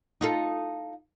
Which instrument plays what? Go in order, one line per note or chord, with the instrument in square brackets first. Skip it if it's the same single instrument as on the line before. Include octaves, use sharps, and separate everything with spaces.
[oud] D#4 F4 A4